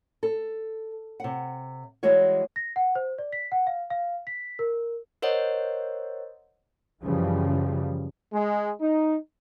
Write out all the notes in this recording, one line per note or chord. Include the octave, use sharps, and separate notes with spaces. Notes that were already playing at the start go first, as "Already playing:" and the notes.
A4
C3 F#5
E3 G3 G#3 F#4 C#5
A#6
F#5
C5
D5
B6
F#5
F5
F5
B6
A#4
A#4 C5 C#5 D#5 F#5
F#2 C#3 E3 F3 G3
G#3
D#4